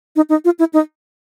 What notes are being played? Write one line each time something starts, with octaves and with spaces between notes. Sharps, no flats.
D#4
D#4
F4
E4
D#4